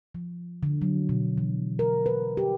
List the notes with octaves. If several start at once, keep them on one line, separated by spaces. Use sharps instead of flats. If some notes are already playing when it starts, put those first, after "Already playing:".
F3
D3
F#3
B2
E3
A#4
B4
G4